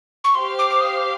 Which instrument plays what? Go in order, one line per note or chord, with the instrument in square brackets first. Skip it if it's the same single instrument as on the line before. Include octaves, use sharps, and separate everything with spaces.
[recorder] C#6
[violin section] G4 C5 F5 [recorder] C6
[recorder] D6
D6
D#6
D6